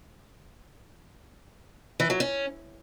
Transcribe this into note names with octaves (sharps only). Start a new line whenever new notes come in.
E3
F#3
C#4